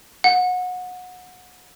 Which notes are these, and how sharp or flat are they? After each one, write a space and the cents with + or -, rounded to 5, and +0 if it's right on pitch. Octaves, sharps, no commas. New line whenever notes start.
F#5 -25